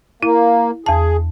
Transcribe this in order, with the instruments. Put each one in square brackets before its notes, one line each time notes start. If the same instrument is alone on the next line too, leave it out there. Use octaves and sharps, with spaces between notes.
[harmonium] A#3 [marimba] E4
[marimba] E2 A5 [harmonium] G#4